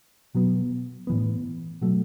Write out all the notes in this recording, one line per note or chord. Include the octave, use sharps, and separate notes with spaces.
B2 F#3 B3
A2 E3 B3
B2 F#3 A3